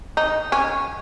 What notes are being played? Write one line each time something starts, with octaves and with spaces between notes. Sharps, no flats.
D#4
C#4